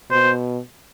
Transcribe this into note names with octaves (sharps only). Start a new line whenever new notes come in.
B2 C5